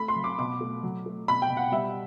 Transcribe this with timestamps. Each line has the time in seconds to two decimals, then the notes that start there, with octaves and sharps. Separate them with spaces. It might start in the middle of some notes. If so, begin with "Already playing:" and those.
Already playing: A3 B5
0.08 C6
0.16 F#3
0.24 D6
0.39 B2 D6
0.61 A3
0.83 F#3
1.06 A3
1.28 B2 B5
1.42 G5
1.50 B2
1.57 F#5
1.72 G3 E5